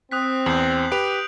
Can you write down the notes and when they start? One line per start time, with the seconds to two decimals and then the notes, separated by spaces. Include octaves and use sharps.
0.11 C4 D#6 F#6 B6
0.46 E2 G6 C7 F#7
0.92 G4 B4 D7 F7